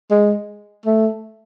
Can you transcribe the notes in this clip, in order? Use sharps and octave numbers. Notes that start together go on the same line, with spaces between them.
G#3
A3